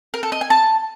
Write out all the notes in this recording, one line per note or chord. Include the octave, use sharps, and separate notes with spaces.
A#4
A4
D#5
G#5
A5